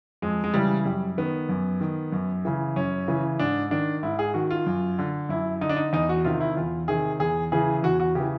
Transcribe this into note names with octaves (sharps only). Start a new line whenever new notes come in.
F2 G#3
G#3
C#3 E3 G3
F#2 G3
D#3 B3
F#2
D#3
F#2
C#3 E3
F#2 C#4
C#3 E3
G#2 D4
D#3 D4
G#2 E4
G#4
D#3 F#4
F4
F#2
D3
F#2 E4
D3 D#4
D4
D#4
E2 D#4
F#4
C3 D#3 F4
E4
E2 F4
C3 D#3 G#4
E2 G#4
C#3 E3 G#4
E2 F#4
F#4
C#3 E3 G4